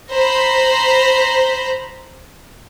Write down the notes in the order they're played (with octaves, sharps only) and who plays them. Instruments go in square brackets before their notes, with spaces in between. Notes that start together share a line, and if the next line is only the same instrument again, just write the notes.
[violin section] C5 A#5 B5